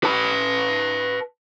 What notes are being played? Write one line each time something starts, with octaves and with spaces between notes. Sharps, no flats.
B4 A5